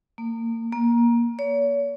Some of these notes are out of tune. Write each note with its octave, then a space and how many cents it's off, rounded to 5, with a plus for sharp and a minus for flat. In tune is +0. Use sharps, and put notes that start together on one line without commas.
A#3 -30
A#3 +20
C#5 +40